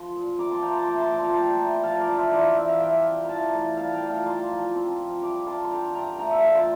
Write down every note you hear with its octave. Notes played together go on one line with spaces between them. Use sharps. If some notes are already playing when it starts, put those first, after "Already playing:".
Already playing: F3 C6
A#2
C4 A#5 D6
A5 C6
F3 G5 A#5
A5 C6
A3 A#5 D6
A5 C6
A#2 A5 C6
G5 A#5
A5
G3 G5 A#5
E4
C6
A#5
F3 F5 A5
A#4 D5
D4
C5 E5
E3 D5 F5
C3 E5
F5
G3 E5 G5
F4
E3 F5 A5 A#5
A2
G3 F5 A5
G5 A#5
A#2
F5 A5
A#3 A5 C6
F3
C4
F3
G3 A#5 D6
F4 A5 C6
C6
D3 G5 A#5
G2 G5 A#5
A3 G5 A#5
E5 G5
A#2 F5 A5
A5 C6